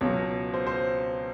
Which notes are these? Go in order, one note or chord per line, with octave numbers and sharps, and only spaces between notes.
C#2 B2 F#3 C#5
C5
C5